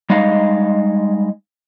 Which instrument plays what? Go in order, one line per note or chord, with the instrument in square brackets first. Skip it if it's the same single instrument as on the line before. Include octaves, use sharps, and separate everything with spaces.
[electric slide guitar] G3 G#3 D#4 D#5 F5